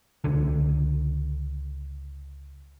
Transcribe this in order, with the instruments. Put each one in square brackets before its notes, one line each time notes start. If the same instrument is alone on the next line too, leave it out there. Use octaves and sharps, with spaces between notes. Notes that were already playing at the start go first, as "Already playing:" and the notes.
[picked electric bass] C#2 D3